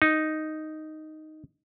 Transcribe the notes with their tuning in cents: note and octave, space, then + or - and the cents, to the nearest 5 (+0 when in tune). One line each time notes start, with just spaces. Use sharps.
D#4 +0